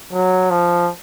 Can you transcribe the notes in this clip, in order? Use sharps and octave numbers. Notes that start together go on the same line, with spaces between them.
F#3
F3